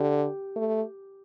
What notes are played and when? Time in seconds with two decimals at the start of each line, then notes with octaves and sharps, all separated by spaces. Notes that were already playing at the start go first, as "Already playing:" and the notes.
Already playing: D3 G4
0.56 A3